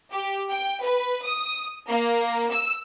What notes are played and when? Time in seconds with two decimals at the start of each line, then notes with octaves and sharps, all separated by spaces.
0.12 G4
0.52 G5
0.83 B4
1.25 D#6
1.88 A#3
2.52 E6